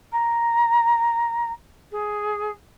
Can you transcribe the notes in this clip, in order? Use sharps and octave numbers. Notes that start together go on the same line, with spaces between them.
A#5
G#4